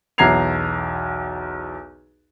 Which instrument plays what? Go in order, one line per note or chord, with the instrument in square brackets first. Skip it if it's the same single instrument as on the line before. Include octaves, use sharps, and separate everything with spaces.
[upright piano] B1 E2 A#5 G#6 C7 F7